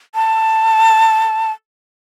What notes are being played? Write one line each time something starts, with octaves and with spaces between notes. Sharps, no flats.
A5